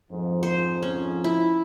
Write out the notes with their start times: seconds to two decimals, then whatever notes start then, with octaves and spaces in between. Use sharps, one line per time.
0.11 F2 G#2 F3
0.43 C5
0.83 C#4
1.24 E4